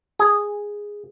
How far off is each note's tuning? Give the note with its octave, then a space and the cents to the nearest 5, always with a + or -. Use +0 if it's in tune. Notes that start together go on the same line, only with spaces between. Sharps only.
G#4 -10